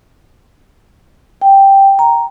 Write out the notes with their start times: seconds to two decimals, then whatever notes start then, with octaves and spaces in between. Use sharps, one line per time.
1.42 G5
1.99 A#5